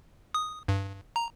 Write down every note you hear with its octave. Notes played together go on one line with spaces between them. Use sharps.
D#6
G2
A#5